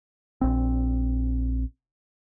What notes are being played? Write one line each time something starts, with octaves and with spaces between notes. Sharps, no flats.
A#1 C4